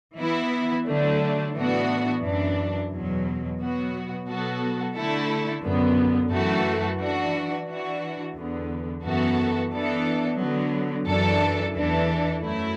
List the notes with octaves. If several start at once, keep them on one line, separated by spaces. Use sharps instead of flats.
E3 B3 E4
D3 F#3 A3 D4
A2 E3 B3 D4 F#4
F#2 E3 D4
E2 B2 F#3
B2 F#3 B3 F#4
B2 F#3 B3 F#4 A4
D3 A3 E4 A4
F#2 D3 B3
F#2 E3 A3 F#4 A4
E3 D4 F#4
E3 D4 F#4
E2 D3 B3
F#2 E3 B3 F#4 A4
E3 B3 D4 A4
D3 F#3 B3
F#2 E3 D4 A4
E2 E3 D4 A4
F#2 F#3 A3 E4